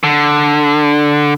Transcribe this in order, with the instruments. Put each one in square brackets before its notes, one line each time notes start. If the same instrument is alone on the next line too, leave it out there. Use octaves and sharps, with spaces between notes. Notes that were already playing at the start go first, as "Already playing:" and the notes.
[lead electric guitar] D3